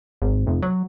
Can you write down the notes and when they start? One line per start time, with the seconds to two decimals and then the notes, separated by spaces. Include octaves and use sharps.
0.22 G#1
0.47 F1
0.62 F#3